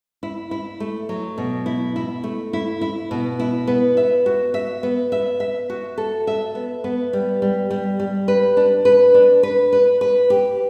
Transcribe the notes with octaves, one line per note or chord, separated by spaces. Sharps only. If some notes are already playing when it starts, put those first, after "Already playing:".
E4
E4
A3
F#3
B2
E4
E4
A3
E4
E4
B2
E4
B3
E5
F#4
E5
B3
E5
E5
F#4
A4
E5
B3
B3
G3
G3
G3
G3
B4
D4
B4
D4
B4
B4
B4
G4